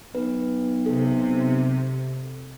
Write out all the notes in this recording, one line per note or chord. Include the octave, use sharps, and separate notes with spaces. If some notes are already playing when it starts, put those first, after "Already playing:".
B1 B4
C3 A4